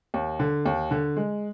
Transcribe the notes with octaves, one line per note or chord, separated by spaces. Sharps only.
D#2
D3
D#2
D3
G#3